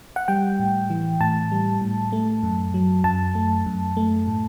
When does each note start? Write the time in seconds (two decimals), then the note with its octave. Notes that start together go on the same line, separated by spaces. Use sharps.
0.16 F#5
0.28 G3 G5
0.59 A2
0.90 E3
1.21 A2 A5
1.52 G3
1.81 A2
2.12 A3
2.43 F#2
2.74 F#3
3.04 F#2 A5
3.35 A3
3.66 F#2
3.97 A3
4.27 A2